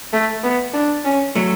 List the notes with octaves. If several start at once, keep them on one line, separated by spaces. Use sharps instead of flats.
A3
B3
D4
C#4
F#3 A3